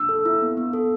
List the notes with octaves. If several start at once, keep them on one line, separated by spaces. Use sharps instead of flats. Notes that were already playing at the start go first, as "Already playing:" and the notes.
Already playing: E6
A4
E4
B3
B3
A4